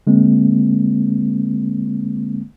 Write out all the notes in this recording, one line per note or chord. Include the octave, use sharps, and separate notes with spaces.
D3 G#3 A#3 C4